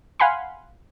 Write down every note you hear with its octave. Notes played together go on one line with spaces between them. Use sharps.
F5 F#5 G#5 B5 C6